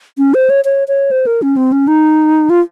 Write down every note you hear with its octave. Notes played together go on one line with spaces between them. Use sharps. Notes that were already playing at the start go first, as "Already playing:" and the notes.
C#4
C5
C#5
C#5
C#5
C5
A#4
C#4
C4
C#4
D#4
F4